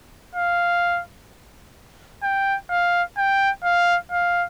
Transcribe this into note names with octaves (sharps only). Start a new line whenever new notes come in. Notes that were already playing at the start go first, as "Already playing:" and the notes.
F5
G5
F5
G5
F5
F5